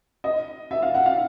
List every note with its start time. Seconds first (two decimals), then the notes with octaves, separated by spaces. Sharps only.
0.24 D#5
0.71 E5
0.83 F5
0.94 F#5
1.06 F5